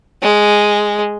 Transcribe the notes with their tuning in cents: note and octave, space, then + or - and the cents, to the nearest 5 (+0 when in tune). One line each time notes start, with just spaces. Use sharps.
G#3 +0